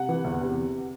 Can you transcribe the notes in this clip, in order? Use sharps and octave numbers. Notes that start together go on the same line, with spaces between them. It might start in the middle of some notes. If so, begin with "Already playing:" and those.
Already playing: C3 F#5
E3
E2
C3